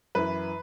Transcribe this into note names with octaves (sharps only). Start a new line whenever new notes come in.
F#2 E3 B4